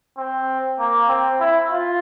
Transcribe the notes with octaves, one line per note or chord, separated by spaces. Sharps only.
C4
A#3
C4
E4
F4